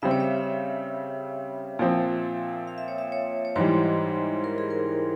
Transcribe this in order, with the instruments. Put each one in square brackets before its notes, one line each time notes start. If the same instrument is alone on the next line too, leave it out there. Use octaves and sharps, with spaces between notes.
[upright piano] C#3 G3 C4 [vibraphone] E5
[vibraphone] C#5
E5
[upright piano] A#2 F3 C4
[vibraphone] F5
E5
C#5
E5
C#5
C#5
[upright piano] G#2 E3 G3 [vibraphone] C5
[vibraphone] A#4
G#4
A#4